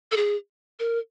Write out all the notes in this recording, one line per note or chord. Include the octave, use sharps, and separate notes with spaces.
A4
G#4
A#4